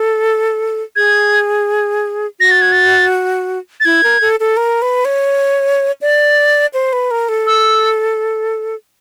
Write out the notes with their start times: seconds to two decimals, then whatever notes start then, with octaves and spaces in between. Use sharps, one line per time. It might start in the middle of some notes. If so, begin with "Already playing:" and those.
Already playing: A4
0.96 G#4 G#6
2.40 F#4 A#6
2.51 A6
2.62 G#6
2.72 A6
3.80 A6
3.85 E4 G#6
4.04 A#4
4.21 A4
4.40 A4
4.57 A#4
4.82 B4
5.05 C#5
6.01 D5
6.74 C5
6.93 B4
7.11 A#4
7.29 A4
7.46 E6